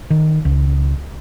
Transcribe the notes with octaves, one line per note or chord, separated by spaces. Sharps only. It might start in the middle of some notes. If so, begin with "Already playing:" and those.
D#3
C#2